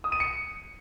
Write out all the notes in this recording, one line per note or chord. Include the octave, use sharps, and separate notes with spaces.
D#6
D#7
C#7